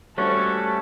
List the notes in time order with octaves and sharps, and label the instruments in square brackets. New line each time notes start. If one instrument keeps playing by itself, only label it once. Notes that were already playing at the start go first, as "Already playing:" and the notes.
[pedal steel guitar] G3 A3 C#4 [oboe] F#4 [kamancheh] A4 [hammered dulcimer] C#5